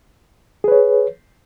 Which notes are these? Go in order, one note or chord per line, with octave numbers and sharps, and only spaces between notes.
G#4 B4 C#5